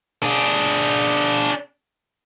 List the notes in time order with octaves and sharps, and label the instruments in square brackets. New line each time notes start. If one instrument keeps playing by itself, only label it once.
[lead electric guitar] D4 G#4